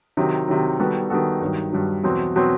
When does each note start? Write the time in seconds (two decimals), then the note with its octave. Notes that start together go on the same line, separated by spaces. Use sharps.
0.17 C3 D#3 F#3
0.48 C3 D#3 F#3
0.79 D#3 G3 B3 F#4 A4
1.10 D#3 G3 B3 F#4 A4
1.41 G2 D#3 F#3
1.72 G2 D#3 F#3
2.04 E2 B2 F#3 C4
2.36 B2 F#3 C4